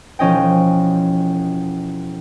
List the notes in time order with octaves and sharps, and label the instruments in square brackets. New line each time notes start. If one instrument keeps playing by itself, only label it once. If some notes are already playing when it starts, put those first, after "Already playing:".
[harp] E1 F3 C#4 D#5 G5